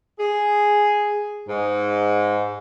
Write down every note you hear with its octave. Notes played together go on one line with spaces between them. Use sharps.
G#4
G#2